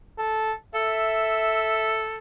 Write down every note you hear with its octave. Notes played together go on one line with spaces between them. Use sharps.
A4
A4 E5